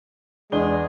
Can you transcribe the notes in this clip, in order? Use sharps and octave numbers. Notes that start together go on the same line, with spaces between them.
E2 G#3 D4 G#4 G7